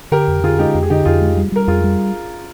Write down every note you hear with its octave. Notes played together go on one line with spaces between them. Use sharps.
D3 G4 A#4
F2
D3 F4 G#4
G#3 D#4 G4
F2 G4
G#4
D3 D#4 G4
F2 F4 G#4
G#3
G3
G3 A#4
F2 F4 G#4
G3